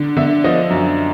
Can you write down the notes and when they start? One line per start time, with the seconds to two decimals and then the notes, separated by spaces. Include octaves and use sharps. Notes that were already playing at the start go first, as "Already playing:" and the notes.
Already playing: D3
0.17 D3 E5
0.44 F3 D#5
0.70 F#2